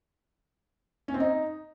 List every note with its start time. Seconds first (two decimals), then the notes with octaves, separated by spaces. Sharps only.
1.08 C#4
1.14 C4
1.20 D#4